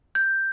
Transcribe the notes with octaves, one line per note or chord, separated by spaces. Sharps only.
G6